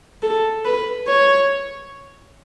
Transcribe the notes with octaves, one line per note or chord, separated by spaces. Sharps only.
A4
B4
C#5